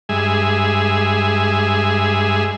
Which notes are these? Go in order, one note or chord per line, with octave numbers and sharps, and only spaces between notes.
G2 G#3 G#4 E5